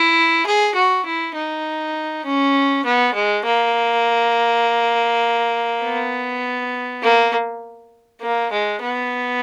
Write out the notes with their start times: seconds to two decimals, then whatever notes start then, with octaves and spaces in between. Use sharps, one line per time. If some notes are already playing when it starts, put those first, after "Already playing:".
Already playing: E4
0.46 G#4
0.75 F#4
1.06 E4
1.35 D#4
2.25 C#4
2.85 B3
3.13 G#3
3.44 A#3
5.83 B3
7.02 A#3
8.21 A#3
8.52 G#3
8.81 B3